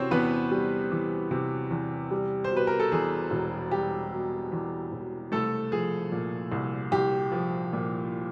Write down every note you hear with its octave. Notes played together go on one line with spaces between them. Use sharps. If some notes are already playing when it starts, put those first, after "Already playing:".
Already playing: C3 E3 C4 C#4 F#4 C5 C#5
E2 B3 B4
G3
E3
C3
E2
G3
C5
B2
B4
A#4
A4
E2 G#4
E1
G3 G4
B2
E2
E1
C2 A3 A4
F3 G#4
A#2
C2
C2 G4
F3
A#2